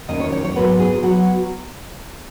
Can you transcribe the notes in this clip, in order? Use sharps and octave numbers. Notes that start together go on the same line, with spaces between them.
E2 D#3 A#3 C#4 D#5
C#5
C#5
C#5
G#2 F#3 B3 B4
G#4
F#3 B3 F#4